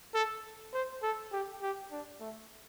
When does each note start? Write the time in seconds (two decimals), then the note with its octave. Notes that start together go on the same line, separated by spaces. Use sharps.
0.14 A4
0.73 C5
1.03 A4
1.32 G4
1.62 G4
1.91 D4
2.20 A3